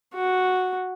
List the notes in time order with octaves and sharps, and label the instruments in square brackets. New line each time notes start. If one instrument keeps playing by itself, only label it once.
[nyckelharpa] F#4